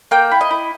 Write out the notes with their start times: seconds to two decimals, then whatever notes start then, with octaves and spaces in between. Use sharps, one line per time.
0.11 A#3 G5
0.31 E4
0.41 D#5
0.51 E4